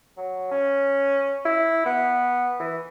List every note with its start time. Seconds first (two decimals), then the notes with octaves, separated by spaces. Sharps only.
0.17 F#3
0.51 C#4
1.45 E4
1.85 B3
2.59 E3